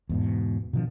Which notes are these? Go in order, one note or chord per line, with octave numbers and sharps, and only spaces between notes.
E2 G#2 B2
B2 D#3 F3 D4